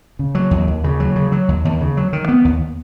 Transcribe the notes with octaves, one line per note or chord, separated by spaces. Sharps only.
C#3
F#3
D#2
D#2
C#3
F#3
C#3
F#3
D#2
D#2
C#3
F#3
D#3
B3
D#2